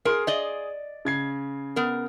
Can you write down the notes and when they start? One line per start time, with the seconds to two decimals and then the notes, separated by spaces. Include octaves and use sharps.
0.05 G#4 A#4 C6
0.27 D5 D#5
1.05 C#3 G#6 C7
1.76 B3 A#4